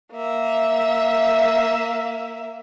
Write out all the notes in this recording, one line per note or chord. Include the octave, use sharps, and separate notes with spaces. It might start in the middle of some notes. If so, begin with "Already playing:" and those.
A#3 E5